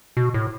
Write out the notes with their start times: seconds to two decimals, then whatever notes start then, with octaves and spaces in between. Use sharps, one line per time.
0.17 B2
0.34 A2